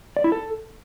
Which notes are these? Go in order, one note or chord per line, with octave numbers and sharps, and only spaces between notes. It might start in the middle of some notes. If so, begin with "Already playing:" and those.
D5
E4
A4